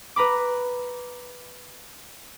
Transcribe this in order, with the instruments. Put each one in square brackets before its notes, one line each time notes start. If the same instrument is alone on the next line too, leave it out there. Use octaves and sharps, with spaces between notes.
[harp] B4 A#5 B5 D6